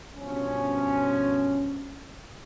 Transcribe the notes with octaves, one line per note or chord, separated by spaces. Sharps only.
G2 B2 F3 C#4